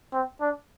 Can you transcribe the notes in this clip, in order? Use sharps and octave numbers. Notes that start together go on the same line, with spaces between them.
C4
D4